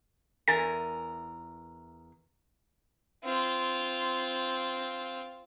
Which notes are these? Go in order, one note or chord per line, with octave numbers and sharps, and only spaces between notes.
E2 A#4 G#5 A6
C4 F4